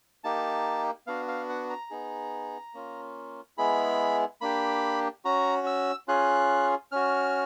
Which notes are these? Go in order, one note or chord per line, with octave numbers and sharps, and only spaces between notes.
A#3 D#4 G4 A5
B3 D4 F#4 F5
F5
F#5
A#5
B3 D#4 G#4
A#3 C#4 F4
G#3 B3 E4 G#4 B5
A#3 D4 G4 B5
C#4 F#4 A#5
E6
C#4 F4 G#4 F#6
C#4 F#4 F6